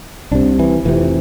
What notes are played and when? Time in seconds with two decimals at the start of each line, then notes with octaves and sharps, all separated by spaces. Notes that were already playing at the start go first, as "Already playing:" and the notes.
0.31 C2 C3 D4
0.59 E3
0.85 F1 F2 C3 E3